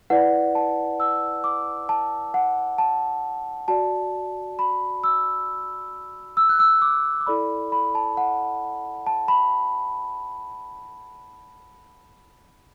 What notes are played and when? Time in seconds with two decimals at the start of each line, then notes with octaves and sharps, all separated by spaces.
0.10 E4 B4 D5 F#5
0.55 A5
1.00 E6
1.44 D6
1.89 A5
2.34 F#5
2.78 A5
3.68 F#4 D5 A5
4.59 B5
5.04 E6
6.37 E6
6.49 F#6
6.60 E6
6.82 D6
7.21 D6
7.27 E4 A4 D5 B5
7.72 B5
7.95 A5
8.17 F#5
9.06 A5
9.28 B5